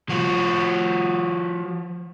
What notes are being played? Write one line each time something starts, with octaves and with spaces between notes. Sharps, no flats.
F3 F#4